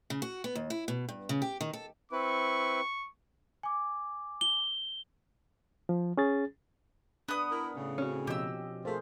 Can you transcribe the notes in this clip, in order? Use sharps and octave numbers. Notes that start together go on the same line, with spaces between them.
C#3
F#4
B3
D#2
E4
B2
G2
C#3
G4
D#3
A4
C4 E4 B4 C#6
G#5 D6
G7
F3
C#4 G#4 A6
B3 D4 D#6
E4 A#4
A2 C#3
C4 C#4 F#4
B2 F3 G4 D#5 E6
A3 F4 G#4 A#4 C5